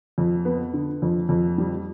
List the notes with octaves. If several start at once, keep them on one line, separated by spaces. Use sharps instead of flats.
F2
B3
D3
F2
F2
G3